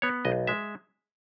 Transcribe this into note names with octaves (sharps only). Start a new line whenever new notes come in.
B3 C#5
B1 D#5
G#3 E5